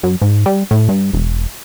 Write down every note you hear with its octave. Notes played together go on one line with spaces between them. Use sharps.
F#2
G#2
G3
A2
G2
E1